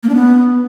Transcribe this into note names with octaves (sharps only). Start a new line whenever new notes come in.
A#3
D4
B3